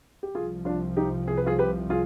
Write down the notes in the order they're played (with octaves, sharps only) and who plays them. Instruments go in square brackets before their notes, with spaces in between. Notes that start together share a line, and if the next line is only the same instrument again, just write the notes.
[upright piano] G4
[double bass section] C2 C3 F3 [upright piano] F4 G#4
[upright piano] D4 F4
D#4 G4
G#4
B4
F4 G#4
G4 B4
F4 G#4